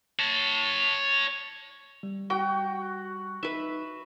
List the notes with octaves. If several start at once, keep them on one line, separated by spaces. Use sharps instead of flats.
C#5 A5
G3
F#4 G5
D#4 B4 E5